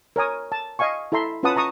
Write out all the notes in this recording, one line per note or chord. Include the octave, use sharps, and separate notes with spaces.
A#4 C#5 G#5 D#6
A5
D#5 F5 G#5 C#6
E4 A4 E5 A#5 C6
C#4 F4 B4 F#5 A5 D#6
A5 A#5 C#6 D#6